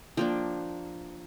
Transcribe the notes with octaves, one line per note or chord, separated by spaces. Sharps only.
F3 A#3 D4 G5